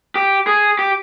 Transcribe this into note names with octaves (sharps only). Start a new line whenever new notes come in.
G4
G#4
G4